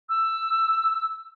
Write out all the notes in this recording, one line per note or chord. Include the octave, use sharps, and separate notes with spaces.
E6